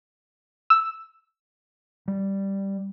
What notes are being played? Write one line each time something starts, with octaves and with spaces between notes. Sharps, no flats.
E6
G3